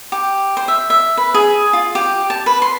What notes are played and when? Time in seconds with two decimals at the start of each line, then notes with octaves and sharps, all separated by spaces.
0.12 G4
0.57 C5
0.68 E5
0.90 E5
1.17 B4
1.34 G#4
1.73 F4
1.95 G4
2.30 A5
2.46 B4
2.62 C6